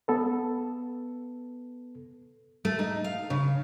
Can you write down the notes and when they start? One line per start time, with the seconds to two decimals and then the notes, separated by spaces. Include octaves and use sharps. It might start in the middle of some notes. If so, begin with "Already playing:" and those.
0.08 B3 A4 B4
2.65 A3
2.79 D#4
3.04 F5
3.30 C#3